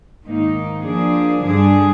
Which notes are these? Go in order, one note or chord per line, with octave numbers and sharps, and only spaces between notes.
G#2 D#3 A#3 D#4
F3 A#3 D4 G#4
G2 D3 G3 D4 G#4